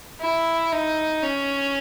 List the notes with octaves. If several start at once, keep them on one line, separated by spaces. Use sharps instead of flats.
E4
D#4
C#4